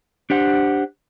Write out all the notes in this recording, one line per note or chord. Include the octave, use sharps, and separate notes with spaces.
D4 G4 C5 F#5